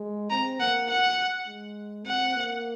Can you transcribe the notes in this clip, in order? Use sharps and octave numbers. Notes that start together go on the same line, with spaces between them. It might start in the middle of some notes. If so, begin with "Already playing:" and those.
Already playing: G#3
C4 A#5
A#3 F#5
F#5
G#3
C4 F#5
A#3